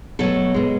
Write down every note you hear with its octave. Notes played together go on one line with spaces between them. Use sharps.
B2 F#3 A3 A4
B2 G#3